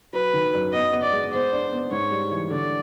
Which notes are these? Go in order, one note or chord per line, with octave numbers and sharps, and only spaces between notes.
F#3 B4
D#3
F#2
B3 D#5
B3
D5
G#3
B3 C5
D4
B3
G#2 C#5
G3
E3
D3 D5